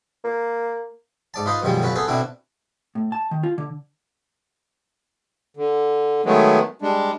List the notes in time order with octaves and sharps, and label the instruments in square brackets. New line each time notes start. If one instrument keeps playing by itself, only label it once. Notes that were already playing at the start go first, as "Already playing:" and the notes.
[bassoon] A#3
[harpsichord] G#2 D5 A5
D#4 F4 B4 C5 D#5
F#2 B2 D#3 F3 G3 G#3
F#2 C#3 F#3 C#4 F4 B4
B3 G#4 A4 B4 C5
B2 D3 C4 D4 E4 F#4
[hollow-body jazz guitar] A2
A5
D#3
F4
D3
[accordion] D3
D#3 F#3 G#3 A3 B3
G3 G#3 D4